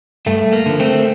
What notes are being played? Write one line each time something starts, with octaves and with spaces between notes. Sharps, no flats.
G2 A3
A#3
D3 F3
A3 C4